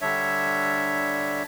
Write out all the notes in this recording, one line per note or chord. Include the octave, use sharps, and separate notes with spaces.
D3 G3 D4 C#5 E5